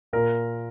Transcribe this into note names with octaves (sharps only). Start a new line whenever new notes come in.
A#2 A#4